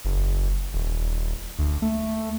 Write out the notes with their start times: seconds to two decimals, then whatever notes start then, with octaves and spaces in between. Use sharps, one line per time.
0.05 F#1
0.74 D#1
1.59 D2
1.82 A3